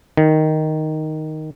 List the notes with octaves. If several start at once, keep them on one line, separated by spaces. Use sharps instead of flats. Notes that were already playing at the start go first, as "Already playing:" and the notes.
D#3